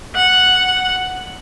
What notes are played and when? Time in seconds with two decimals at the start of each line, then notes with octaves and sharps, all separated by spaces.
0.16 F#5